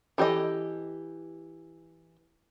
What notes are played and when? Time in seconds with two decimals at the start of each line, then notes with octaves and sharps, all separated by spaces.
0.18 E3 G4 A4 D#5